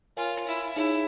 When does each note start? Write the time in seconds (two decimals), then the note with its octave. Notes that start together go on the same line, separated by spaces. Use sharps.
0.17 F4 A#4 C#5 F5 G#5
0.47 E4
0.76 D#4 E4 G#4 C#5